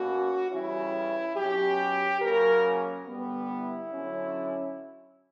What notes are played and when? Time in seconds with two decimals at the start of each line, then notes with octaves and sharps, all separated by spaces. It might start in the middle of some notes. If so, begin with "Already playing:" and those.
Already playing: B2 A#3 C#4 F#4
0.50 C#3 E3 G3 C#4 E4
1.36 B2 F#3 C#4 G4
2.21 C#3 F#3 A#3 C#4 A#4
3.07 D3 G3 B3
3.49 E4
3.91 D3 F#3 C#4